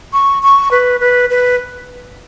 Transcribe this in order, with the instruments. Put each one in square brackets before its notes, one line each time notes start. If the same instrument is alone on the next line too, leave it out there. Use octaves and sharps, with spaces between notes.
[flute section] C#6
C#6
B4
B4
B4